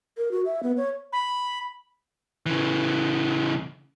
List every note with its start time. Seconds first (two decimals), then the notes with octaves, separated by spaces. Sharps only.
0.18 A#4
0.31 F#4
0.46 E5
0.63 B3
0.77 C#5
1.13 B5
2.46 C#3 E3